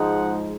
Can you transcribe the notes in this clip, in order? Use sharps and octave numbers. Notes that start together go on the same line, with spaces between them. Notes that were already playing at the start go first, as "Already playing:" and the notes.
Already playing: G#2 F3 G#3 D#4 F#5